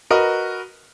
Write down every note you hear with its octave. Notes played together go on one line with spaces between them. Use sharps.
F#4 A#4 B4 D#5